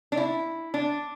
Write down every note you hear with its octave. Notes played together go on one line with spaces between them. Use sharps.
D4
E4
D4